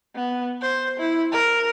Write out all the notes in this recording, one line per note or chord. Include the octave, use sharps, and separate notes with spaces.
B3
C5
E4
A#4